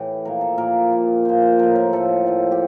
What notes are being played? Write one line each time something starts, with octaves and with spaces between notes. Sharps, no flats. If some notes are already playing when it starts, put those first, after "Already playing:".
Already playing: A2 E3 G4
A#2 F3 A#4
A4
A#2 F3 A#4
A#2 F3
A#2 F3 C5
C5
A2 F3 A#4
A#4
A2 F3 A4
A2 F3
G4